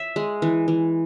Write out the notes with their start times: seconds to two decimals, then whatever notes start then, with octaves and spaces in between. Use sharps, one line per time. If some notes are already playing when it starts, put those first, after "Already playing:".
Already playing: E5
0.16 G#3
0.42 E3
0.68 E3